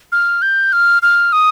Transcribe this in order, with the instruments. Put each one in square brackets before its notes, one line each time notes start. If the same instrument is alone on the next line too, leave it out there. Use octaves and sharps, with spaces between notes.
[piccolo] F6
G6
F6
F6
D#6